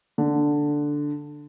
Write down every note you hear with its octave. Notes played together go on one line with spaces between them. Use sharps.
D3